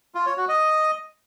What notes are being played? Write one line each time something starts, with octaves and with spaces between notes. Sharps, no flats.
F4
C#5
F#4
D#5